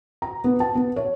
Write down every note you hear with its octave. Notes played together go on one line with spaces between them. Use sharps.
A#5
B3
A5
B3
C#5